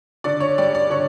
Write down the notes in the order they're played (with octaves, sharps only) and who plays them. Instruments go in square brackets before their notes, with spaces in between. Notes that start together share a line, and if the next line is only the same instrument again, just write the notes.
[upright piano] D3 D5
C#5
G3 D5
D5
D3 C#5